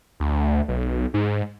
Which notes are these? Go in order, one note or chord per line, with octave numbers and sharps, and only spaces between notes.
D2
B1
G#2